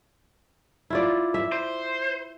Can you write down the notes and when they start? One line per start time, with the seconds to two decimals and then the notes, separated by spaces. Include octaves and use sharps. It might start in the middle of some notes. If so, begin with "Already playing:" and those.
0.90 E4 F4 D5
1.34 E5
1.52 C5